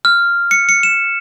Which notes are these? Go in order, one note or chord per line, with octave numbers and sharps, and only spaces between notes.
F6
C#7
C#7
E7